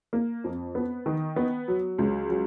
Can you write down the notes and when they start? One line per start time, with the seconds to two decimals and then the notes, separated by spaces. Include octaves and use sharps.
0.13 A#3
0.44 F2
0.75 B3
1.06 D#3
1.36 B3
1.68 F#3
1.98 C#2
2.29 F#3